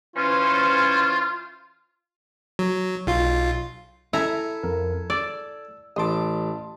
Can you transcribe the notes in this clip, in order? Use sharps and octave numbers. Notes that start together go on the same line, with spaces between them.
E3 C#4 F4 C5
F#3
B1 F4
E4 A4 E5 G#5 A#5
F2 A#4
D5 E6
A1 A5 C6 D6 D#6